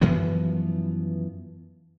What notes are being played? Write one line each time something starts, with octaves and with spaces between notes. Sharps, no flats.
F#2 E3 F3 B3